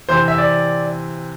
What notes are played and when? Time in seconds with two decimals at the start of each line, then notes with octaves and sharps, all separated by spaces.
0.09 C3 E3 C4 C5
0.28 E5
0.38 D5